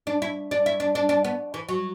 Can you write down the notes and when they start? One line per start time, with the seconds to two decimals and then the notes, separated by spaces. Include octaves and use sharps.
0.07 D4
0.22 E4
0.51 D4
0.66 E4
0.80 D4
0.95 D4
1.09 D4
1.24 B3
1.54 E3
1.69 F#3